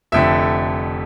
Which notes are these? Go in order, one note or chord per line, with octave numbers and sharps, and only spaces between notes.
F1 F2 D3 E5